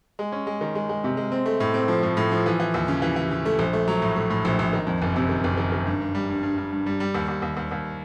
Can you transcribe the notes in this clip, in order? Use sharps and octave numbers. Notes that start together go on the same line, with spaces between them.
G#3
C#4
G#3
D#3
G#3
G#3
C3
G#3
C4
A3
A2
C4
F3
A2
A2
F3
E3
E3
D#2
C#3
E3
E3
C#3
A3
A#1
A3
F#3
A2
A3
A2
A#1
A#1
D#3
F2
F#1
C3
D#3
F#1
D#3
D#3
G2
G2
G3
G2
G2
G2
G2
G3
G3
D#2
D#2
D#2
D#2
D#2